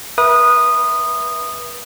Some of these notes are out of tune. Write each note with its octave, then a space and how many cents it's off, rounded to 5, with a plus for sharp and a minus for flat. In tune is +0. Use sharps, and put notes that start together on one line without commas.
B4 -35 E5 +0 D#6 -15